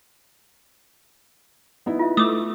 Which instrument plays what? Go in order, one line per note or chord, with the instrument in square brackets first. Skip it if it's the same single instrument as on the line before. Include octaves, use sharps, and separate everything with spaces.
[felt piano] B3 D#4 E4
[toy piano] F4 E5
[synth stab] A3 [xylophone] D6 D#6